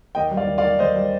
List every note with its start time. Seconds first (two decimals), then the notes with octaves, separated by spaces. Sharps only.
0.15 D#2 D#5 G5
0.31 G3
0.37 D5 F5
0.47 D#2
0.58 D5 F5
0.63 D#3
0.79 D#2 C5 D#5
0.96 G3